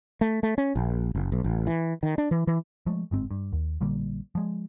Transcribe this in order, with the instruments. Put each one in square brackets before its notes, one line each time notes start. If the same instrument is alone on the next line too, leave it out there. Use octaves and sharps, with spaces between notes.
[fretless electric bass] A3
A3
C#4
A#1
F#1
B1
A1
E3
D#3
D4
E3
E3
[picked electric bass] F3 G#3 A3
G1 G#2 C4
G2
D#2
A#1 D3 G3 A#3
F3 G#3